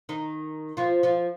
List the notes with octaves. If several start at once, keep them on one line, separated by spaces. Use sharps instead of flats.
D#3 D#4
F3 F4
F3 F4